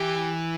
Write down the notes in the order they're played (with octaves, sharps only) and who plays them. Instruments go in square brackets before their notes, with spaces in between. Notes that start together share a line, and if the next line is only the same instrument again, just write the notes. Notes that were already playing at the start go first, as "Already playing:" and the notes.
Already playing: [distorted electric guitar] E3 [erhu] G4